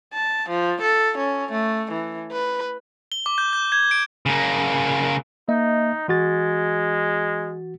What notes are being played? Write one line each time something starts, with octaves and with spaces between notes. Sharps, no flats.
A5
F3
A4
C#4
A3
E3
B4
G7
D6
G6
G6
G#6
D7
C#3 A#3
A#3 D#4 D#5 E5
E3 G#3 F#4 A6